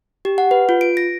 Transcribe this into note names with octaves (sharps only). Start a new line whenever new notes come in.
G4
F#5
B4
F4
D7
A#6